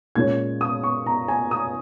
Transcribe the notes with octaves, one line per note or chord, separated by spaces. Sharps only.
A#2 G#3 C#4 G#6
D#6
C#6
A#5
G#5
D#6